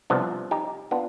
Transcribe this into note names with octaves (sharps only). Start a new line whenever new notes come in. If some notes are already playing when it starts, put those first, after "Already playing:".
C2 C3 F3 B3 D4
D#4 G4
B3 D4 F4